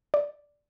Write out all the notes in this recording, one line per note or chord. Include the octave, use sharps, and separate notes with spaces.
D5